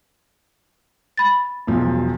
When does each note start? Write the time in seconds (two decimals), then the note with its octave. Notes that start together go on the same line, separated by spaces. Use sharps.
1.17 B5 A6
1.67 E1 B1 F3